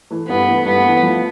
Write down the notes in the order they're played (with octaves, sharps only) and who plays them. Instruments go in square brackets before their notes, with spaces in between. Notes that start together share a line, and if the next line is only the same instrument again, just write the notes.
[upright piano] E3 A3
[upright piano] G2 [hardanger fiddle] B3
[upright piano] E3 A3
[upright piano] G2 [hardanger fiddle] B3
[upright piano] E3 A3
F3